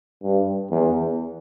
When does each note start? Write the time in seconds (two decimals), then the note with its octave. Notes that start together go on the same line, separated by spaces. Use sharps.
0.22 G2
0.71 E2